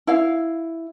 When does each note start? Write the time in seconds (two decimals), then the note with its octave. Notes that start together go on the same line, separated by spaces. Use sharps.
0.07 E4 F5